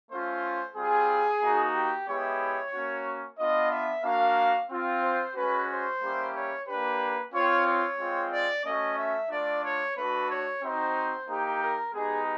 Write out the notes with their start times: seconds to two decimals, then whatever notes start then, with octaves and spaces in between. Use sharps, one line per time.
0.10 A3 C#4 F4 C5
0.76 G3 C4 F4 G#4
1.42 A#3 D#4 F#4
1.75 G4
2.08 G#3 B3 E4 G4 C#5
2.73 A#3 C#4 F#4
3.39 B3 D4 F4 D#5
3.72 E5
4.04 A#3 D4 F#4 F5
4.70 C4 F4
5.03 C5
5.36 G#3 C#4 F#4 B4
5.69 C5
6.02 G3 A#3 C#4 E4 G4
6.34 C#5
6.67 A#3 D4 G4 B4
7.33 C4 F4 C#5
7.66 C#5
7.99 G#3 C4 F4
8.32 D5
8.65 A3 C#4 F#4 D#5
8.97 E5
9.30 A3 D4 F4 D5
9.63 C#5
9.96 A3 D4 F#4 B4
10.29 C#5
10.61 C4 D#4 F#4 C5
11.28 A#3 D#4 G4
11.61 A#4
11.93 G#3 B3 D#4 G4 G#4